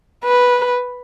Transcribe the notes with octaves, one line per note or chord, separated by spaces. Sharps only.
B4